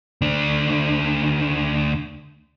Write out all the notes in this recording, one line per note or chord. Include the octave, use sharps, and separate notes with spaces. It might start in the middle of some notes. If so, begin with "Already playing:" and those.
D2 D4